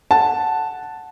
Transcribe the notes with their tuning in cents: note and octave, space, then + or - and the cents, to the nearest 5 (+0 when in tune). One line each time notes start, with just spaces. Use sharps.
F#5 +0 A5 +0